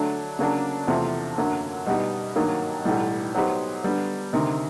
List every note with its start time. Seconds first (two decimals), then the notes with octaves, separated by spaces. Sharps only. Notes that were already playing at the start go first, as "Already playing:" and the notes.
Already playing: D3 F#3 A3 D4
0.39 C#3 F#3 A#3 D4
0.88 E2 C3 F3 A3
1.38 F#2 D3 F#3 A#3
1.86 B2 G3 B3 D#4 G4
2.36 G#1 G2 D#3 F#3 A#3
2.85 B1 A2 E3 G3
3.34 F#3 B3 D#4 G4 C5
3.84 D3 G3 B3
4.33 D2 C3 D#3